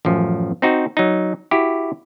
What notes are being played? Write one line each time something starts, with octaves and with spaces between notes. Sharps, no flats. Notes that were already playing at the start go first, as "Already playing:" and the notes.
A1 F#2 F3
C4 D#4 F#4
F#3 D#4
E4 F#4 G4